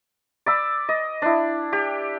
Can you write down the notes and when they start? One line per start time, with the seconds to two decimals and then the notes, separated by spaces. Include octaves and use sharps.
0.46 D5 B5 E6
0.89 D#5
1.22 D4 E4
1.73 G4